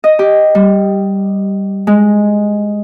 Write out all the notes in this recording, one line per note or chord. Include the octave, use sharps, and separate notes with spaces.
D#5
G4
G3
G#3